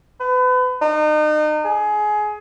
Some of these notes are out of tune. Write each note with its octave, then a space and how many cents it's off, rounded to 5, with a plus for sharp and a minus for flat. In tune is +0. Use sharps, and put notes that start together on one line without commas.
B4 +35
D#4 -35
G#4 +20